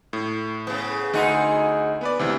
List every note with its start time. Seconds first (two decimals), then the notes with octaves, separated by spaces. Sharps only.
0.13 A2
0.67 C#3 B3
1.13 D2 D#4 G#4 F#5 C6
2.01 B3 B4 D5
2.19 D2 C3 E3